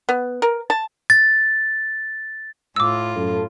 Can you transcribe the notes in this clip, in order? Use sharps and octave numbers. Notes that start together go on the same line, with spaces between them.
B3
A#4
A5
A6
A2 F4 D6 E6
F#2 A4